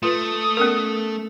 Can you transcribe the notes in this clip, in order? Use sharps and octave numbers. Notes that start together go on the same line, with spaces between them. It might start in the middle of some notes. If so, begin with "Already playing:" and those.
A3 F4 B4 D#6
B3 C#4 A#4